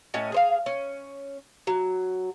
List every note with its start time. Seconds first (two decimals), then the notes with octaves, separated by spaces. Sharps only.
0.14 A2 C#4 D#5 G#5
0.32 G#4 C5 F5
0.66 C#4
1.67 F#3